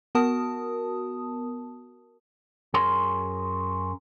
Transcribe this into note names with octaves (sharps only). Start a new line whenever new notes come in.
B3 F#4 A#4 A5 D#6
F#2 G#4 A#4 C#5 C6